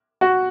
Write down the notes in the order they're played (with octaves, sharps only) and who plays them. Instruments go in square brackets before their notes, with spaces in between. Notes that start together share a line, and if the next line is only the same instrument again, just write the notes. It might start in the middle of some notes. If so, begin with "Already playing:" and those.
[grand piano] F#4